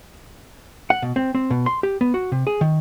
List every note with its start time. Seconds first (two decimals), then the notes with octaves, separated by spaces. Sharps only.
0.90 F#5
1.02 B2
1.16 C4
1.35 C4
1.51 B2
1.66 C6
1.83 G4
2.01 B3
2.14 F#4
2.32 C3
2.47 G#4
2.61 D#3